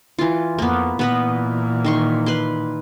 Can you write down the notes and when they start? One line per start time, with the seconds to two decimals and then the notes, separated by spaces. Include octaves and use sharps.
0.19 E3 F4
0.59 F2 A#3 B3
0.99 A#2 E3 B3 B4 D#5
1.85 D#3 C6 C#6
2.26 B4 C6